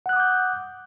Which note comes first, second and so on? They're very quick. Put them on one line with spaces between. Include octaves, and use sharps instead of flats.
F#5 F#6 D#6 D6 G6